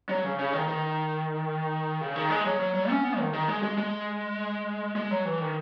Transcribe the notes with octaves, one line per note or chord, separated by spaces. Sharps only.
F#3
C#3
C#3
D#3
D#3
C#3
D#3
G#3
F#3
F#3
F#3
C#4
B3
D#3
D#3
G#3
G#3
G#3
G#3
F#3
E3
D#3